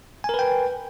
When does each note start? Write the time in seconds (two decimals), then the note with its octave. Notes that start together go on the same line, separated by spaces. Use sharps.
0.24 G#5
0.29 A#4
0.34 B4
0.39 G5